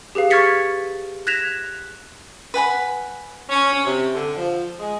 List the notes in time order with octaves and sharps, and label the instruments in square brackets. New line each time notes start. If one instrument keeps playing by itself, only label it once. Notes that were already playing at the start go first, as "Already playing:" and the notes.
[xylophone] G4 G#4 B4 F5
C#6 F6 G#6 A6 B6 C#7
F#6 G#6 A#6 B6 E7 F7
[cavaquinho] B4 F#5 G#5 B5
[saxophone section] C#4
C#4
C3
D3
F3
G#3